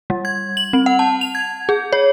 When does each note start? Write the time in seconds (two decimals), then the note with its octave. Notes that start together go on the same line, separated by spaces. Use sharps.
0.10 G3
0.25 G#6
0.57 F#7
0.73 C4
0.86 F#5
0.99 A5
1.21 F7
1.35 G#6
1.69 G#4
1.93 C#5